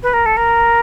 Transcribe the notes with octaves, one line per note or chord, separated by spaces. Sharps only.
B4
A#4
A4
A#4